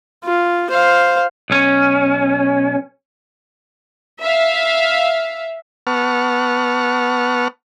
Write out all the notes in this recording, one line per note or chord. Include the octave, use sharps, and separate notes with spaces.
F4
C5 F5
B1 C#4
E5 F5
B3 F#5 A5 C#6 F6